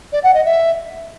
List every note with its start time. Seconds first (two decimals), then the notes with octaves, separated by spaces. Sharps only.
0.13 D5
0.23 F#5
0.34 D#5
0.45 E5